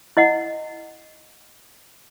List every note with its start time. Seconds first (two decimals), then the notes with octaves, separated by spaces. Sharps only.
0.17 E4 D#5 F#5